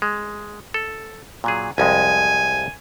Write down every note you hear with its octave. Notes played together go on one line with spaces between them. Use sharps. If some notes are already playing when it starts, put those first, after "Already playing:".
G#3
A4
A#2 F#3 G#4
C2 F2 G#3 G#5